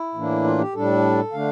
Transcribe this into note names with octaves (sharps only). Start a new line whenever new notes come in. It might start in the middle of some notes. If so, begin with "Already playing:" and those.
Already playing: E4
A2 E3 A#3 D4
F4
G4
A2 G3 D4 A4
D3 A3 D4 F5